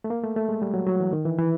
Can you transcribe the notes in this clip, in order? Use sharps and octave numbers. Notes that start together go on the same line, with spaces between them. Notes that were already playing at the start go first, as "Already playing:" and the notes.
A3
A#3
A3
A3
G#3
G3
F#3
F#3
E3
D#3
E3
E3